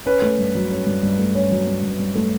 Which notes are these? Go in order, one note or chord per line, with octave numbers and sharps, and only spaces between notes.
C#4 B4
A3
G2
F#3
C#4
G2
G2
A3
C#4 C#5
F#3
G2
G2
G2
A3